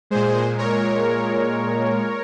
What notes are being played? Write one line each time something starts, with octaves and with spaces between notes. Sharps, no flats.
A#2 G#3 G#4 C5
A#4 C#5